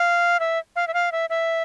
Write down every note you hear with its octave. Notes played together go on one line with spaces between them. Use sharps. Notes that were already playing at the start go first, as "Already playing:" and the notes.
Already playing: F5
E5
F5
E5
F5
E5
E5